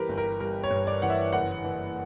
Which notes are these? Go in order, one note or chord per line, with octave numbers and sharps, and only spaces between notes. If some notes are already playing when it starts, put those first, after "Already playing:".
Already playing: E3 G3 G4 A#4 B4
G1
A#4
G3 A#4
C#5
G2
D5
E3 F#5
E5
F#1 F#5
E3